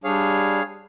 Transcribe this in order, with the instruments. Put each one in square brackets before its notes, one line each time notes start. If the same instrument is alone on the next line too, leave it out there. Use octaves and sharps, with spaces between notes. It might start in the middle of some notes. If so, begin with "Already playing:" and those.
[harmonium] G3 D4 [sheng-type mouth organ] G#4 C#5 F5